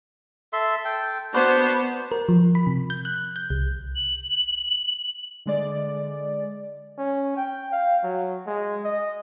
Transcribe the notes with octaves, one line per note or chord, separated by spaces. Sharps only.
A4 E5 C6
A4 G5
B3 D4 F#4 B4 C5
A#4
F3
B5
C3
G6
F#6
G6
C2
F#7
D3 G#3 D5
C#4
G5
F5
F#3
G#3
D#5